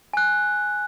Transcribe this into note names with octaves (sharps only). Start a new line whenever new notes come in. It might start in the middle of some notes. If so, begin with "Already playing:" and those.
G#5 F#6